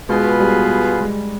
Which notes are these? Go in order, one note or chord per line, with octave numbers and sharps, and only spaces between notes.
B2 G#3 B3 F4 G#4 B4
G3
G#3